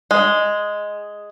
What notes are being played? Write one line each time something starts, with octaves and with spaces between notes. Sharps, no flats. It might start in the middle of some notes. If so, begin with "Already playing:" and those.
G#3